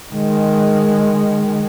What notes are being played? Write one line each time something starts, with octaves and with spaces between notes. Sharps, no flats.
D#3 G#3